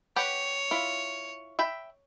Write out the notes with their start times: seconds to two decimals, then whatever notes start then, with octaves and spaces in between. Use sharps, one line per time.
0.16 G4 B4 C#5 F#5
0.71 E4 F4
1.59 E5 G5 B5